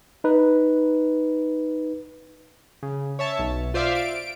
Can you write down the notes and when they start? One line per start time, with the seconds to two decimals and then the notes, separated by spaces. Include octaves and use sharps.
0.24 D#4 B4
2.83 C#3
3.19 C#5 E5 A5
3.39 B1
3.74 F4 C5 D5 E5 F5
3.95 D7